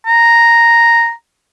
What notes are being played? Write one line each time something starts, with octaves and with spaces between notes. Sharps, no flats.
A#5